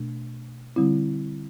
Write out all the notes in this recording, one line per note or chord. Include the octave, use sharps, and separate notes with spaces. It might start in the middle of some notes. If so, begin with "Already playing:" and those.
Already playing: B2 A3 D4
D3 G3 C4 E4